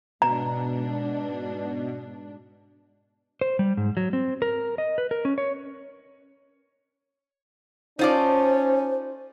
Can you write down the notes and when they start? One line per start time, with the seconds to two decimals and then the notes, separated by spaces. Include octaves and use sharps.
0.22 G#2 B2 D4 A#5
3.41 C5
3.59 G3
3.77 G#2
3.97 F#3
4.13 C4
4.42 A#4
4.78 D#5
4.98 B4
5.11 A#4
5.25 C#4
5.38 C#5
7.99 A3 C#4 D#4 F4 C5 D5 A5